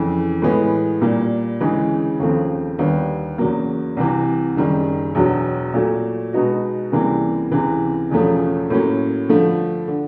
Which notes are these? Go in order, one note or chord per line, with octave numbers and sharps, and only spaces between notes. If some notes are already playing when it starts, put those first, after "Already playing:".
Already playing: F2 C#3 E3
A2 E3 G#3 B3
A#2 G3 A#3
D2 C#3 E3 G#3 C#4
D#2 C#3 F3 A3 C4
D#2 D3 G3 B3
E2 C#3 F#3 A#3
C2 C3 E3
F#1 F#2 D#3 G3
E1 E2 B2 F#3
A#2 F#3 A3
B2 G#3 B3 D#4 F#4
C#2 C3 E3 G3 A#3
C#2 C3 E3
E1 E2 C#3 F3 A3
A2 F#3 A#3 C#4
G2 D3 F3 A3
D3